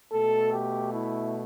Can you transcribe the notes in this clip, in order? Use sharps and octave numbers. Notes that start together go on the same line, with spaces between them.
B2 A3 A4
G4
E4